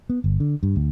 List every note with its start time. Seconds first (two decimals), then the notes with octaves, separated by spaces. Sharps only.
0.10 B3
0.24 G1
0.40 D3
0.63 G2
0.76 D2